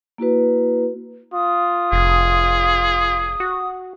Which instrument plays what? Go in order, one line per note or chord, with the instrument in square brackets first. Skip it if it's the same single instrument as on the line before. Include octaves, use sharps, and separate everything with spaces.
[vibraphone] A#3 E4 F#4 B4
[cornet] F4 [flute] D#6
[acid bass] F1 [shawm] G#4
[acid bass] F#4